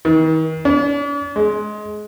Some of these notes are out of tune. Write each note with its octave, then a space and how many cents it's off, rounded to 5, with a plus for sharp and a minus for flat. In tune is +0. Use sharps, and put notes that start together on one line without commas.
D#3 +40
D4 -45
G#3 +20